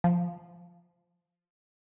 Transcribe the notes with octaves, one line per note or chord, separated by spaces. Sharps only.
F3